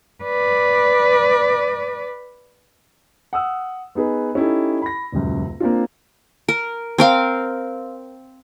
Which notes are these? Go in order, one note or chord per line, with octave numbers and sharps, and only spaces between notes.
B4 D5
F#5 D#6 E6
B3 D#4 G#4 B4
C#4 D#4 E4 G4 A4
B5 A#6
D#1 C#2 F#2
A#3 C4 D4 F4
A#4
C4 A#4 F5